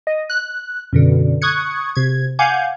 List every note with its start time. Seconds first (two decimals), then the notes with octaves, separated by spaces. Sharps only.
0.07 D#5
0.30 F#6
0.93 F#2 B2 D3
1.42 C#6 D#6 F#6 G#6 C#7
1.95 C3 G#6
2.39 F5 F#5 G#5 D6 G6 G#6